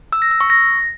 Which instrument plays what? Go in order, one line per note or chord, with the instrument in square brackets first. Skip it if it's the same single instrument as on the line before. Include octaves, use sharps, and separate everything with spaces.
[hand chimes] E6
A#6
E6
C#6
A#6